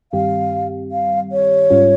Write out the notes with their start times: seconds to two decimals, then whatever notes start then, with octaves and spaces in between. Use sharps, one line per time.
0.12 G2 D#3 G3 C4 G4 F5
0.92 F5
1.32 C#5
1.70 G#2 G3 C#4 F4